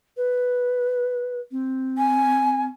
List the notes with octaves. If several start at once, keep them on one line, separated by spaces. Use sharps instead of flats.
B4
C4
G#5